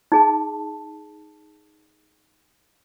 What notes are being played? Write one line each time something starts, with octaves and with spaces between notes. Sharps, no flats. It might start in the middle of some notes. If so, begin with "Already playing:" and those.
D#4 G#4 A5